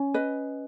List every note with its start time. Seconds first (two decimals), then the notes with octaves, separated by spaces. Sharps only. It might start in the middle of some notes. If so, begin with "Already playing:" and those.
Already playing: C#4
0.14 B4 D#5